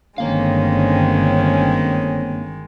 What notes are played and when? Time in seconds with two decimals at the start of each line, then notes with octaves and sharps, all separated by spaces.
0.18 G1 D3 D#3 G#3 A#3 C4 C#4 F5